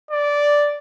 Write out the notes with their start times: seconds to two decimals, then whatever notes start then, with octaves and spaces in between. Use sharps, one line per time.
0.11 D5